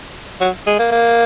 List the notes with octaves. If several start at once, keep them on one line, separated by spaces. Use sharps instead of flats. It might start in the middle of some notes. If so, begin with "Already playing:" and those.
F#3
G#3
A#3
A#3